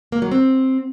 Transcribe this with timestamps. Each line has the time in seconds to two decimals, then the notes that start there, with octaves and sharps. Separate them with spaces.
0.12 A#3
0.22 F#3
0.31 C4